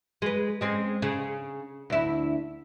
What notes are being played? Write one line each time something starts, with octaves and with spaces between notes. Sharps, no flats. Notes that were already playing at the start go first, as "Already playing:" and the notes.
G#3 B4
G#3 C4 C#4
C#3
D2 E4